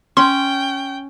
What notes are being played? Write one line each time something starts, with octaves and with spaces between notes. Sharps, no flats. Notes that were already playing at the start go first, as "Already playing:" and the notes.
C#4 G5 C6